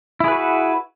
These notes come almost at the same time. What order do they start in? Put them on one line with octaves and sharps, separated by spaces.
E4 G#4 B4 F#4